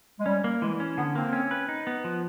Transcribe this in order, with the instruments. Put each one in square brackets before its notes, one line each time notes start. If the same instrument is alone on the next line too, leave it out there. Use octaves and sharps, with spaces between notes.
[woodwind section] G#3
[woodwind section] G3 [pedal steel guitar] C#4
[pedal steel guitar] A#3
[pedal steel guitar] E3 [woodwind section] G#3
[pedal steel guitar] C#4
[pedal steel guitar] D3 [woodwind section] B3
[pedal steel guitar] A#3 [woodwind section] C4
[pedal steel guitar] C#4
B4
D#4
B3
F3